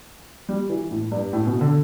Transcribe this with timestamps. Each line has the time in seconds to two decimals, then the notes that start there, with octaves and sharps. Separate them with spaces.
0.49 G3
0.69 E3
0.91 A2
1.12 G2
1.33 A2
1.47 B2
1.61 D3